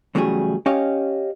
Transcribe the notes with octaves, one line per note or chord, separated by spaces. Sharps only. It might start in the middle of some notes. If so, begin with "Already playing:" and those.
E2 A2 C#3 F#3 G3 G#4
C#4 G4 C#5 D#5 F5